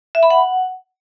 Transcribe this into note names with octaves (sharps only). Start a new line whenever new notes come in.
E5
B5
F#5